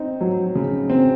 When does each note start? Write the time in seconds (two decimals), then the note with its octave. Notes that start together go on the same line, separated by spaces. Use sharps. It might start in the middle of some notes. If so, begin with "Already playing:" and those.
Already playing: C4 D#4
0.21 F#3
0.55 C#3
0.90 C4